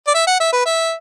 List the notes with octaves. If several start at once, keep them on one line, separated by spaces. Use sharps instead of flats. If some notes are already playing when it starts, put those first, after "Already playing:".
D5
E5
F#5
E5
B4
E5